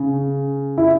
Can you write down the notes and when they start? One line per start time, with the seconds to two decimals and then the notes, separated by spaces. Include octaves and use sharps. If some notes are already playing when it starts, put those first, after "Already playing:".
Already playing: C#3
0.78 E4